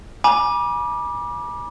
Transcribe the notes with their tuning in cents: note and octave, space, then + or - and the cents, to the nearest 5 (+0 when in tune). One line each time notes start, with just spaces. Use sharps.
G#5 +15 B5 -40 D6 +10